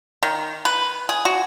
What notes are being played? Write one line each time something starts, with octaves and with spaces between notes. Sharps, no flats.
D#3
B4
G#4
F#4